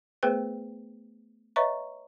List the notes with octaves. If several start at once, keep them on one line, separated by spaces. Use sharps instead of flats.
A3 B3 G#4 B4 C5 G5
B4 C#5 D#5 E5 A#5 C#6